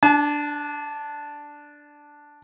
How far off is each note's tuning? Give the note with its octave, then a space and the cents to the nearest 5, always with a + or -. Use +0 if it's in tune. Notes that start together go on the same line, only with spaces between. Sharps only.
D4 +0 A5 -45